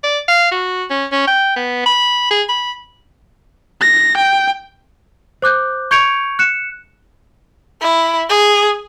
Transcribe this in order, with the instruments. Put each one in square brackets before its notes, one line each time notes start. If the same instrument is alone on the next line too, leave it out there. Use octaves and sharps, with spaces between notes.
[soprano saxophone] D5
F5
F#4
C#4
C#4
G5
B3
B5
G#4
B5
[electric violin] A#6
G5
[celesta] C5 D6 F#6 G6
C#6 G6 G#6 C#7 D7 F7
F#6 C#7 E7
[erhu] E4
G#4